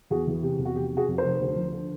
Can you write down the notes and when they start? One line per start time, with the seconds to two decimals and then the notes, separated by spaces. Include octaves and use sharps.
0.10 E2 F#4 G#4
0.27 E3
0.42 C3 G4
0.59 E2
0.65 F#4
0.75 F1 G4
0.92 C3
0.97 F#4 G#4
1.08 F2
1.18 A#4 C5
1.24 F1
1.40 D2
1.56 F3
1.72 D3